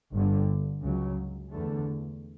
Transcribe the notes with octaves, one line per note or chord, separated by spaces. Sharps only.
G1 G2 D3
C#2 C#3 F#3
E2 D3 A3